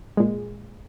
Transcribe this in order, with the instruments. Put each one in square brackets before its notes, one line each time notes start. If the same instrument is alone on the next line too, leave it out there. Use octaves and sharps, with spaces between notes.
[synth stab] A#2 G#3